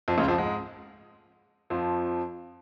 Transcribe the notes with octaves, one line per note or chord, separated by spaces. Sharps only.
F2 F3
C#2 C#3
F2 F3
G#2 G#3
F2 F3